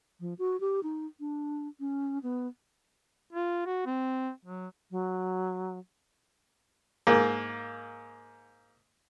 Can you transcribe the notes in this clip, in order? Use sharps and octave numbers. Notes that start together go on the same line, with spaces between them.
F3
F#4
G4
D#4
D4
C#4
B3
F4
F#4
C4
F#3
F#3
G#2 A#3